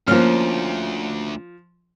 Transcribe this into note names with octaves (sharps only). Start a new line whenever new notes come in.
D2 F3 A#3 C#4 F6